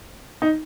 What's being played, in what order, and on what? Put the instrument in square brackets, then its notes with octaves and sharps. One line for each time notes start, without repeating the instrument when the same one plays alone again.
[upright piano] D#4